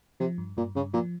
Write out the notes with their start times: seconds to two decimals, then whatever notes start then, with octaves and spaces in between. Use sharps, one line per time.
0.20 C3 F3
0.38 G2
0.57 G2 A#2
0.75 G2 C#3
0.93 A#2 F3